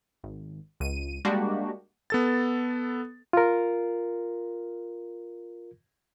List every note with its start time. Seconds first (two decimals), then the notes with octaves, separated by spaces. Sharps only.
0.24 G#1
0.80 C#2 D#7
1.25 G3 G#3 A#3 D4 F#4 G4
2.10 B3 A4 A6
3.33 F4 A#4